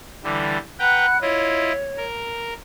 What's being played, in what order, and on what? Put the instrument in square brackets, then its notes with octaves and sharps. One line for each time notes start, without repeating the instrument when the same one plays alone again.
[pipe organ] D3 E3 G3
[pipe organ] B4 G5 A#5 [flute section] F#5 B5 F#6
[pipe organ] E4 F4 D#5 [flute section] C#5
[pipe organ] A#4